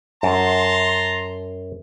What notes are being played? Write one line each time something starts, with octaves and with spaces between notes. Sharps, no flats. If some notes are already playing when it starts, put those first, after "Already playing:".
F#2 A5 A#5 C6